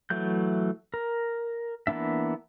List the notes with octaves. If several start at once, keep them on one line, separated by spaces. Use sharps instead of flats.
E3 F#3 A3 G6
A#4
E3 A#3 B3 D4 E5